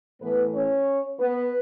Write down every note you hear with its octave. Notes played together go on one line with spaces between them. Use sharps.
A2 E3 A3 B3 B4
C#4 C#5
B3 B4